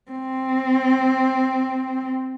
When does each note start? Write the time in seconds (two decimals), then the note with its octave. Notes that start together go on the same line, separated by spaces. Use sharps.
0.11 C4